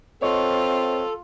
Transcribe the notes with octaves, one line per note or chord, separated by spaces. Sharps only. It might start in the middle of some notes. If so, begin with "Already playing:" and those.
C4 F4 A4 C#5 D#5 C#6